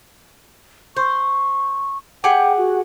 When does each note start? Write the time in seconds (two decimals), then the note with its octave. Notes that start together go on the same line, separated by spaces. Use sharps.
0.96 C5 C#6
2.24 G4 G#4 F#5 G5
2.57 F#4